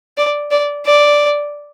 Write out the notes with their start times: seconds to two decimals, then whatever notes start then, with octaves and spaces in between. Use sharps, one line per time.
0.18 D5
0.51 D5
0.86 D5